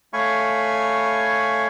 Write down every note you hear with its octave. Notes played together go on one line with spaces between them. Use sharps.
A3 C#5 F5 G#5 B5 C#6